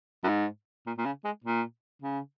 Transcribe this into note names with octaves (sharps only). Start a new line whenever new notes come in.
F#2
G#2
A#2
A#2
C#3
G#3
A#2
C#3